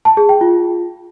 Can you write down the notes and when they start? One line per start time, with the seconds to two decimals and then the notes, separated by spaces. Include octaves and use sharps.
0.05 A5
0.17 G#4
0.29 G5
0.41 F4